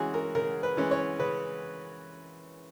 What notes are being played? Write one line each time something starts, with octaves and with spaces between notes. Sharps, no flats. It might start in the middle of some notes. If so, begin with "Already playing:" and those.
Already playing: C#3 E3 G#3 C#4 F#4 G#4
A#4
C#3 A#4
B4
E3 G#3 C#4
C#5
C#3 B4